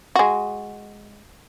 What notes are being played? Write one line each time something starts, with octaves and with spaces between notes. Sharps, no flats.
G#3 F#4